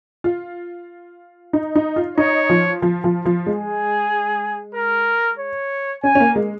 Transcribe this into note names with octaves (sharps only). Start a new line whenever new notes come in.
F4
D#4
D#4
F4
D#4 C#5
F3
F3
F3
F3
G#3 G#4
A#4
C#5
C#4 G#5
C#4
A#3
G#3